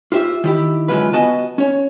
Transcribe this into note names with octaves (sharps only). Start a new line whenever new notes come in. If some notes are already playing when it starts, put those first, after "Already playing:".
F4 G4 C5 E5
D#3 E4 G4
F#2 D3 G#3 F4 B4
B3 F#4 B4 D#5 G#5 A5
C#4 C#5